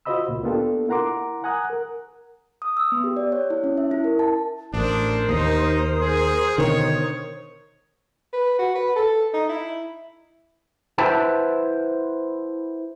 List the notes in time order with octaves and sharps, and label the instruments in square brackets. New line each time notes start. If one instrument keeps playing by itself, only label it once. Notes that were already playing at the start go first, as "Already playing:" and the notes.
[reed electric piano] F4 F#4 C5 D#5 B5 E6
C#2 A#2
A#3 B3 D4 F4 G4 A4
E4 A#4 F#5 A#5 C6 D6
F#5 G#5 A#5 D#6 F#6
A#4
[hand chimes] D#6
E6
B3
G4
D5
C#5
E4
C#4
E5
E4
A#4
A5
[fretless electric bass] A1 [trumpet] D4 [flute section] A#4 C5 D#6
[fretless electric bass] D#2 [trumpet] D#4
[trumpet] G#4
[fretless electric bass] B2 D3 D#3 [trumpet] C#5
[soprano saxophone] B4
F#4
B4
A4
D#4
E4
[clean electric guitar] E4 B4 C5 E5 F#5 A5